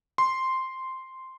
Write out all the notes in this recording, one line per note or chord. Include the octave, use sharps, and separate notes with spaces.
C6